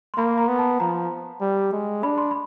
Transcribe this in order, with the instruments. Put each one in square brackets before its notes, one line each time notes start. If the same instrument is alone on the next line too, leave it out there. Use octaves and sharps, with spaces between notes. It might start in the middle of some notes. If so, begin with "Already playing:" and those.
[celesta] C6
[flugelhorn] A#3 [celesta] B5
[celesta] A#5
[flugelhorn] B3
[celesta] A5
[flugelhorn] F3 [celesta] A#5
[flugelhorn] G3
G#3
[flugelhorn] D4 [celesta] B5
[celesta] C6
B5